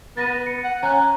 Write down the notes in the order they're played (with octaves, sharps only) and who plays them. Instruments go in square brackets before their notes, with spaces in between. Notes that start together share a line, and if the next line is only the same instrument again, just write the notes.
[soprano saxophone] B3 [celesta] A6 A#6 D#7
[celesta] C#7
[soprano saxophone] F#5
[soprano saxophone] C#4 [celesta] A#5 F#6